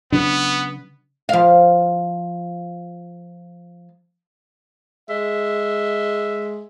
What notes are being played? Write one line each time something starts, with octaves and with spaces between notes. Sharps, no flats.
C#3 F#3 B3 D4
F3 F5
G#3 E5